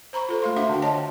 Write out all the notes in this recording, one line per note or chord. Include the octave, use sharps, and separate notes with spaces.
C5 A#5 B5 C#6
F4 A4 C5
A3 F5 C6
D4 F#4 E5 F#5 C6
D3 G5
C#5 D#5 A5